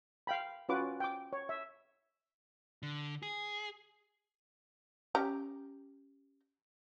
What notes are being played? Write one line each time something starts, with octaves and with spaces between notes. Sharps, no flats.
F5 G5 B5
C#4 F4 F#4 B4 D6
G5 D6
C#5
E5
D3
G#4
C#4 G4 A#5